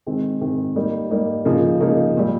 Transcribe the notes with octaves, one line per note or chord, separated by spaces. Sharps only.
D#3 G#3 C4
D#3 G#3 C4
G3 A#3 D#4
G3 A#3 D#4
C#3 F3 A#3 D#4
C#3 F3 A#3 D#4
A#2 G3